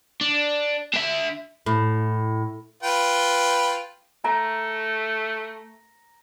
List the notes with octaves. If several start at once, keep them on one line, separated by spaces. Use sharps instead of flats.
D4
D4 E5
A2
F4 B4 G5
A3 A#5